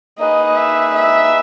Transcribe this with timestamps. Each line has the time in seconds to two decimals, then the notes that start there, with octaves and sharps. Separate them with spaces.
0.18 A#3 D#4 G#4 B4 D#5
0.56 E5
0.95 E5